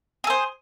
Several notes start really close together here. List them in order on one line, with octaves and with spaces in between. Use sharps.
G#4 A4 C5